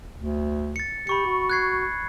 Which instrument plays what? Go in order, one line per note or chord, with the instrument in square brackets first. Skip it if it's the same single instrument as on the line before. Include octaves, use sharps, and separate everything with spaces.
[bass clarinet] D2
[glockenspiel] A6 C#7
[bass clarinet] G4 [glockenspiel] B5 C#6 C#7
[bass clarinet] F#4
[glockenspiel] F#6 G#6 C7